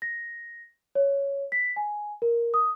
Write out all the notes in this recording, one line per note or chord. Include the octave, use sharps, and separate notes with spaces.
A#6
C#5
B6
G#5
A#4
D#6